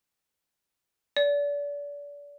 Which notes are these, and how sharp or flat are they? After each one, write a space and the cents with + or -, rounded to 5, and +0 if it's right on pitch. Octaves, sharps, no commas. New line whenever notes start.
D5 -30